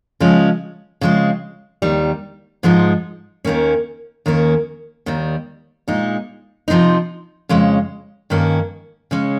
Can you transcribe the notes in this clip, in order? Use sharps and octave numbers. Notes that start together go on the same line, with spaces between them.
C#3 F3 G#3 C#4
C#3 F3 G#3 C4
D#2 D#3 G3
G#2 F3 G#3 D#4
D#2 D#3 A#3 C#4
D#2 D#3 A#3 C#4
D#2 D#3 G3
A#2 G#3 D#4
C3 F3 C4 D#4
F2 C#3 G#3 C#4
G2 D#3 A#3 C#4
C#3 G#3 C#4